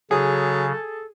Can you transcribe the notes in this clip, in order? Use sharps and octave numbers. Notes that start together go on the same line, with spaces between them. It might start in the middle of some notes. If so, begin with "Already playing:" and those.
C#3 F#3 G#4 A4